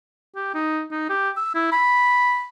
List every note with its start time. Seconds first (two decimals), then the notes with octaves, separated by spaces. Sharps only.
0.36 G4
0.54 D#4
0.91 D#4
1.09 G4
1.37 E6
1.55 E4
1.72 B5